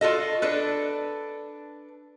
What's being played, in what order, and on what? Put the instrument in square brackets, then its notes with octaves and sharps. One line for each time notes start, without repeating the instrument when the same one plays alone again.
[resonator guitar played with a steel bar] F4 F#4 A4 D#5
D4 A4 B4